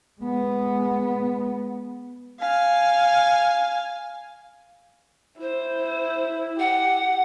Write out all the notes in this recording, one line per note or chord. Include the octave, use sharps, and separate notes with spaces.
G#3 B3
F5 G#5
E4 C5
G4 F#5